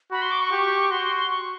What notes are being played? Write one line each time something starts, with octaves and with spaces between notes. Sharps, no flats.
F#4 B5
C6
D6
C#6
G4
F#4 C6
C6
C6
C#6